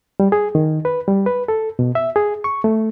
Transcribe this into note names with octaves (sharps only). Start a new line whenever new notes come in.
G3
G#4
D#3
B4
G3
B4
A4
B2
E5
G#4
C#6
A3